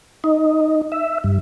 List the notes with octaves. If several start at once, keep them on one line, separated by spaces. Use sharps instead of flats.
D#4
E5
G2